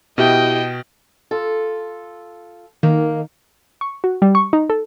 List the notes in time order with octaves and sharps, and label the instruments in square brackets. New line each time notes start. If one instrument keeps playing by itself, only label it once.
[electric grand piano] B2 [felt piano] E4 G4 [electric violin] D#5 G5
[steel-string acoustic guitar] F4 A4
[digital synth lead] D#3 [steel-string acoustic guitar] A#3
[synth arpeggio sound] C#6
F#4
G3
C#6
D#4
A4